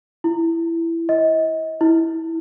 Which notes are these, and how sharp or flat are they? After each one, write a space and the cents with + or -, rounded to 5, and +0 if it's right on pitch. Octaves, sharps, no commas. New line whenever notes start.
E4 +15
D#5 +35
E4 -20